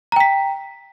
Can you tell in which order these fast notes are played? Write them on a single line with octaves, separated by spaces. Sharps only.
A#5 G5 B6